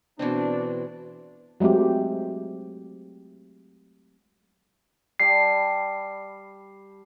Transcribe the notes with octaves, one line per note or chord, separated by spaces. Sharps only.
B2 E3 C4 D4
F#3 G#3 A3 C4 G4
G3 A5 C7